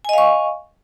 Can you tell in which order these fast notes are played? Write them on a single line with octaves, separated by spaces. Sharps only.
G#5 D#5 F5 C#6